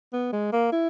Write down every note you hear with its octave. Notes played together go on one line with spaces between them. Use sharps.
B3
G#3
A#3
E4